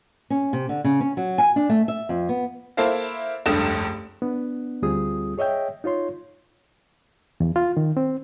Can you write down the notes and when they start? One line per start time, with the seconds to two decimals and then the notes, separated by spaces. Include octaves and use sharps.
0.30 C#4
0.53 C3
0.69 D3
0.84 C#3
1.00 C#4
1.17 F#3
1.38 G#5
1.56 D4
1.69 A3
1.88 E5
2.09 F2
2.29 B3
2.77 A#3 E4 A4 C5 F5
3.46 F1 C#2 G2 A4 D#6 E7
4.22 B3 D4
4.82 D2 G3 C4 F4 G#4 D#6
5.38 G#4 C#5 D#5 E5 G5
5.84 D#4 F4 C#5 C6
7.40 E2
7.56 F4
7.77 D#3
7.97 C4